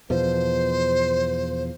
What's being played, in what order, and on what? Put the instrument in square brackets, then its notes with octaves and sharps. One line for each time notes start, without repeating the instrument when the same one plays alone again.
[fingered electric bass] E2 B2 F3 [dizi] C5